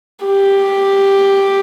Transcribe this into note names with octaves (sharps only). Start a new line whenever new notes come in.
G4